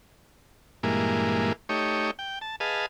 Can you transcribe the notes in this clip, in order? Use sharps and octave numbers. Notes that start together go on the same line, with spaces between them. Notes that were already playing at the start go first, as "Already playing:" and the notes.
G2 A#2 E3 G#3 A#3
A3 D#4 G4 C#5
G5
A5
G#4 B4 D#5 F5 A5